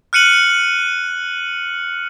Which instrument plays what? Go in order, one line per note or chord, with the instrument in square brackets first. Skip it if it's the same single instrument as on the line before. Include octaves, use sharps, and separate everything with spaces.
[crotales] F6 F#6 C#7 D#7 F#7